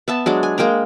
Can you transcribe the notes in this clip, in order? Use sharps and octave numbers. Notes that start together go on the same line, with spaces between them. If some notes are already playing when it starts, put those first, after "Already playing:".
B3 E5 A5
F#3 G#3 D4
G#5
G#3 A#3 G5 A#5